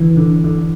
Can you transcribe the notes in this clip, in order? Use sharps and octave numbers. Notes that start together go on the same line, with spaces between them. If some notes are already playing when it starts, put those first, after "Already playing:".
Already playing: D3 E3
D3
D3